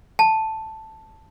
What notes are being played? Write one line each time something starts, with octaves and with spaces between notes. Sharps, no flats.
A5